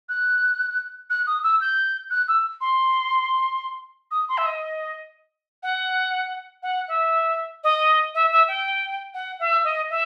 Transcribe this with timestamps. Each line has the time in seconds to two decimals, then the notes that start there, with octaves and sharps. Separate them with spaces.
0.09 F#6
1.10 F#6
1.26 D#6
1.43 E6
1.61 G6
2.10 F#6
2.28 E6
2.61 C6
4.11 D#6
4.28 C6
4.37 E5
4.46 D#5
5.63 F#5
6.62 F#5
6.88 E5
7.63 D#5
8.14 E5
8.31 E5
8.48 G5
9.14 F#5
9.39 E5
9.64 D#5
9.90 E5